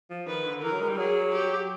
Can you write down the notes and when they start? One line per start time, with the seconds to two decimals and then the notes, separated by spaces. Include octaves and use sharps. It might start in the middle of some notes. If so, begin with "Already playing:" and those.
0.10 F3
0.27 D#3 B4
0.45 D3
0.63 E3 A#4
0.72 F#3
0.81 G#3
0.89 G3
0.97 F#3 G#4
1.33 G4